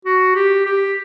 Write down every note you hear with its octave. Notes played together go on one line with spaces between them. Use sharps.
F#4
G4
G4